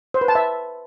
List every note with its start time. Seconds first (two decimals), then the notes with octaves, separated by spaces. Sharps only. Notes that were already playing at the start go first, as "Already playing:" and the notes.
0.14 C5
0.21 B4
0.28 A5
0.35 E5